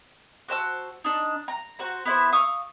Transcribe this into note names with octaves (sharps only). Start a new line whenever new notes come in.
F#4 C5 A5 E6
D4 D#4
A#5
F#4 C5 A#5
B3 E4 C5
F5 C#6 D#6 E6